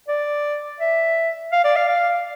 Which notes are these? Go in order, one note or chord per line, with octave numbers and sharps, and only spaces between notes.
D5
E5
F5
D5
F5
F5